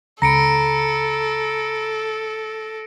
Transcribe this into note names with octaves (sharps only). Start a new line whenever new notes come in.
C#2 A4 A#5 B5 A#6 C#7 D7